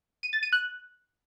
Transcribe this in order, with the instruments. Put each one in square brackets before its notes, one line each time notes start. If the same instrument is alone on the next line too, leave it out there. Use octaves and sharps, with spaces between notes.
[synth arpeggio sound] D#7
A6
D#7
F#6